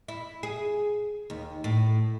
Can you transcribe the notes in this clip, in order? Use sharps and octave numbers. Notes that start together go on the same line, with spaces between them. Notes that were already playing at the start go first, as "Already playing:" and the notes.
E4
G#4
D#2
A2